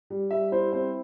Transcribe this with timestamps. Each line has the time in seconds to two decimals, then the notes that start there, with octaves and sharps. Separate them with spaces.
0.10 G3
0.31 G3 E5
0.52 E4 C5
0.73 C4 C5